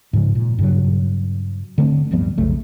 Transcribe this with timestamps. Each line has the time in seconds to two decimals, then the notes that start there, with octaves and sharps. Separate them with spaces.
0.13 G#2 C#3 F3
0.35 A#2
0.59 G2 C#3 F#3
1.78 D3 A3 C4
2.11 D1 G2 F3 B3
2.38 B1 F2 C#3 A3